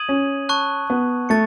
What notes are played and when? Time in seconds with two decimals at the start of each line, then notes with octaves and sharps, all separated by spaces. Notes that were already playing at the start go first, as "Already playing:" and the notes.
Already playing: D#6 G#6 D#7 F#7
0.09 C#4
0.49 A5 C#6 F#6
0.90 B3
1.29 A3 A6 C#7